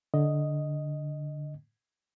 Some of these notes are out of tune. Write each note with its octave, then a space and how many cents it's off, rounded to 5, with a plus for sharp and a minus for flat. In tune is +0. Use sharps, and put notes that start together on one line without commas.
D3 +0 D#5 +0